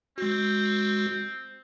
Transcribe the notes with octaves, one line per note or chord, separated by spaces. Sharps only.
G#3 C4 F#4